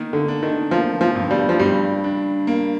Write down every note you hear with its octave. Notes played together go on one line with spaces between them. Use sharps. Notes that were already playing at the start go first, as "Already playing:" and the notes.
Already playing: D#3 A#3
D3
D4
D#3
F3 A#3
F3
G2
G3
F3
G2 G3
D4
A#3